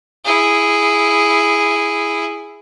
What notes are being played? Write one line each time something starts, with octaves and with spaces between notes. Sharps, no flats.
E4 G#4